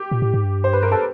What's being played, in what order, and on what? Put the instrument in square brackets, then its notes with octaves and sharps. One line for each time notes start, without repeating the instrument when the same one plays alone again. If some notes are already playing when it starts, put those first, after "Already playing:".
Already playing: [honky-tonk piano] G4
[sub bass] A#2
A2
G#2
G2
[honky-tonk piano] C5
B4
A#4
A4